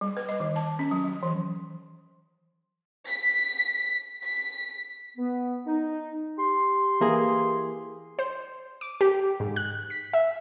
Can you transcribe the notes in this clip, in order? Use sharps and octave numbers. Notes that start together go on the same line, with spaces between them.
G3
B4
D#5
D#3
A5
C#4
F#3
F#3
E3
B6
B6
B3
D#4
G4 C6
E3 A#3 G#4
C5
D6
G4
G#2
F#6
B6
E5